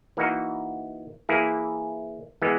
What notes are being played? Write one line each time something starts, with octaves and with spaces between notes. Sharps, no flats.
E3 A#3 D#4 F#4
E3 A#3 E4 G#4
E3 G#3 B3